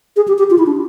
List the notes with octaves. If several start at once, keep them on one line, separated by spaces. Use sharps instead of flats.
G#4
G4
G4
F4
E4
D4